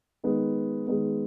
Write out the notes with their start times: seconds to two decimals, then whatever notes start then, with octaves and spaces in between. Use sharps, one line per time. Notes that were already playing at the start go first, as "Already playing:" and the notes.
0.24 D#3 G#3 B3
0.87 D#3 G#3 B3